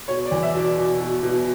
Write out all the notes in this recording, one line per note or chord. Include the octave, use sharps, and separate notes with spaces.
B2 C#5
D5
E2
E5
B2 D5
B2
B2
B2